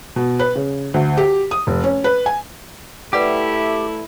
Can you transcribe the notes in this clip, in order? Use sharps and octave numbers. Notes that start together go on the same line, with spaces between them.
B2
B4
C#3
D2
G4
D#6
F1
C#4
B4
G#5
A3 E4 G4 B4 D5 F#5